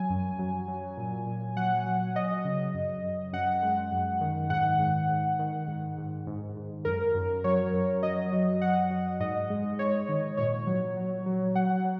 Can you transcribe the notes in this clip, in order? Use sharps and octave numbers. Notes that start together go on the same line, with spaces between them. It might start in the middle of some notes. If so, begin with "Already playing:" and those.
Already playing: F#3 G#5
F#2
F#3
F#3
A#2
A#2
F#3 F#5
F#3
F#3 D#5
C#3
F#2
F#2
F#2 F#5
G#3
F#2
D#3
G#2 F#5
G#2
G#2
D#3
G#2
G#2
G#2
G#2
F#2 A#4
F#2
F#3 C#5
F#2
F#3 D#5
F#3
F#3 F#5
F#3
G#2 D#5
G#3
G#2 C#5
D#3
A#2 C#5
F#3
F#3
F#3
F#3 F#5
F#3